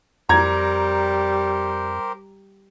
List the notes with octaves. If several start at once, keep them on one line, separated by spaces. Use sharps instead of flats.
F2 G3 G4 A#4 C5 A#5 G#6